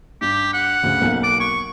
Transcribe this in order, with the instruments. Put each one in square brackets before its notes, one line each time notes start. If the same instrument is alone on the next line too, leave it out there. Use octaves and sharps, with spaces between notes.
[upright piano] G2 [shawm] G4
[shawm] F#5
[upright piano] D2 C#3
B1 A#3
[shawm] D6
C#6